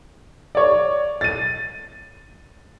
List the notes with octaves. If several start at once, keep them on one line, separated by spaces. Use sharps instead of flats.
C#5 D5
A6 D#7